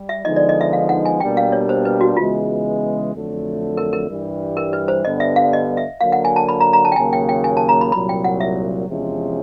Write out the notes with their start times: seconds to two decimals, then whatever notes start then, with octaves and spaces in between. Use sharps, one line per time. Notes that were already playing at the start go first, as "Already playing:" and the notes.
Already playing: G3
0.09 E5
0.25 D3 F3 G#3 B3 D#4 D#5
0.36 D5
0.49 D#5
0.61 E5
0.73 F5
0.89 F#5
1.05 G#5
1.20 B2 G3 A#3 D4 G4 G5
1.37 F5
1.52 C#5
1.69 C5
1.85 B4
2.01 F#4
2.17 C#3 E3 G#3 B3 F4
3.13 F2 D3 F#3 A3
3.77 A#4
3.93 A#4
4.09 G2 E3 G3
4.57 A#4
4.73 B4
4.88 C5
5.05 G2 D3 G3 B3 D#5
5.20 E5
5.36 F5
5.53 D#5
5.77 E5
6.01 D3 F#3 A#3 F5
6.12 F#5
6.25 G#5
6.36 A5
6.49 B5
6.60 A#5
6.73 A#5
6.85 A5
6.92 G5
6.96 D#2 C#3 F#3 A#3 G#5
7.13 G5
7.29 G5
7.44 G#5
7.57 A5
7.69 A#5
7.81 B5
7.92 C2 A#2 F#3 B5
8.09 G5
8.24 F#5
8.41 E5
8.88 E2 C3 F3 G#3 C#4